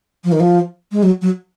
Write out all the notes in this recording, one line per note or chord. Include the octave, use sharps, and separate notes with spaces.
F3
D#3
F3
G#3
F#3
F#3